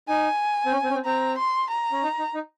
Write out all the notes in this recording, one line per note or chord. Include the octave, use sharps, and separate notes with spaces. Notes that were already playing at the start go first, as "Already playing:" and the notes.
D#4 G#5
C4
C#4
C4
C#4
C4
C4 A#5
C6
A#5
C#4
D#4
D#4
D#4